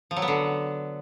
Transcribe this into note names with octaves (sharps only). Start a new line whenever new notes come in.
F3
F#3
B3
D3